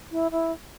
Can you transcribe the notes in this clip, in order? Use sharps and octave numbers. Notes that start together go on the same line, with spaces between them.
E4
E4